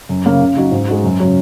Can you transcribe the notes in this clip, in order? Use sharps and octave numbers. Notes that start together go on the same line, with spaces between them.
F#2
C#3 A#3 C#4
C#3
F#3 D#4 F#4
G#2
G#3 D#4 F#4
F#2
C#3 F#3 C#4